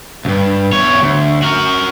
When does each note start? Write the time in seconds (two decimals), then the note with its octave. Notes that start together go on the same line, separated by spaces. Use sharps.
0.25 C#2 G2
0.72 E2 C#5
1.03 D2
1.42 F#4 A#4